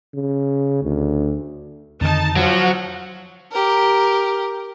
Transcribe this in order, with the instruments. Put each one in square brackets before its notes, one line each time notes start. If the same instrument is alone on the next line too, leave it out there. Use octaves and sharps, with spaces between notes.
[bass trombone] C#3
D2
[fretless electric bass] F2 D3 D#3 [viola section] D#4 A5
[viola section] F3 [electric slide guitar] F#3 [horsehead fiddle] F#5
[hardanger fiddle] G4 A#4